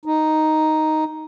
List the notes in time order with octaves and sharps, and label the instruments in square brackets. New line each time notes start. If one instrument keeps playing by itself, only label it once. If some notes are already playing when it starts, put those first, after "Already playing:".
[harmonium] D#4